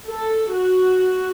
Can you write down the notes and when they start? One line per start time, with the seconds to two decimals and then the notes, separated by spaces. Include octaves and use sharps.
0.10 A4
0.55 F#4